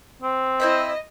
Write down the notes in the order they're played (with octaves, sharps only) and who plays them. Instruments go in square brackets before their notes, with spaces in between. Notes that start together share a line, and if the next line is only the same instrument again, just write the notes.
[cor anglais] C4
[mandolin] E4 C5 E5 [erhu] D#5